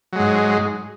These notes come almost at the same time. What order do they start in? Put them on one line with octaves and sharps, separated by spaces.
F#3 G#3 G#2